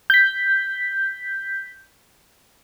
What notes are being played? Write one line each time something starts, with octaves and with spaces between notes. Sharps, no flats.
G6 B6